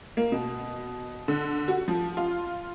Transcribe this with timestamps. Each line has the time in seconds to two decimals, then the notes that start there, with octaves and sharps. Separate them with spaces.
0.17 A#3
0.32 B2
1.28 D3
1.68 F#4
1.88 F3
2.17 F4